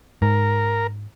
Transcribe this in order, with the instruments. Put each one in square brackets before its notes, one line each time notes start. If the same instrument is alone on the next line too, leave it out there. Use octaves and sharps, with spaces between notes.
[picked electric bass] G#2 [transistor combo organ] A#4